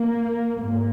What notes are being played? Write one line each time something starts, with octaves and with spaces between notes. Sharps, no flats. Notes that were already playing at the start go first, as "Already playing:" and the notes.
Already playing: A#3
G#2 A#3